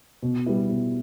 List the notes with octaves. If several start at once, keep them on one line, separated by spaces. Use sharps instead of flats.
B2
G3 B3 E4
B2